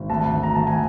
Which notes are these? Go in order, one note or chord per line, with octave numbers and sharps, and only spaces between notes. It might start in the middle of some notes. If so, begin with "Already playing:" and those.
Already playing: G#1
D2 A5
D2
A#5
D2 A5
G#5